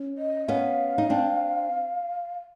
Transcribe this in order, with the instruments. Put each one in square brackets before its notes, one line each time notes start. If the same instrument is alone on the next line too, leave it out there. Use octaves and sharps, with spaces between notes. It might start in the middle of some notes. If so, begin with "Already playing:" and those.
Already playing: [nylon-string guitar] C#4
[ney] D#5
[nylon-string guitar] B3 C#4 [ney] F5
[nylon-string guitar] D#4
C4 D4